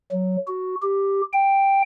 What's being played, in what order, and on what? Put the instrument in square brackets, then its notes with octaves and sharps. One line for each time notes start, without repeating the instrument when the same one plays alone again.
[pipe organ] F#3
F#4
G4
G5